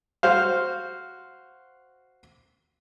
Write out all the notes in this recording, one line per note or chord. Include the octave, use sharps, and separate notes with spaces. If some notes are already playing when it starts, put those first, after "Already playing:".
F#4 C5 F5